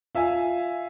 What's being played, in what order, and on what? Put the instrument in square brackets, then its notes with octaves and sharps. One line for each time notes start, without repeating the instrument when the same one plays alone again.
[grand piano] F4 E5 F5 G#5